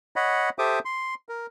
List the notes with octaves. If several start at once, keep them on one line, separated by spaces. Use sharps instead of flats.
C#5 D#5 F#5 B5
G4 A4 C5 E5 D6 D#6
C6
A#4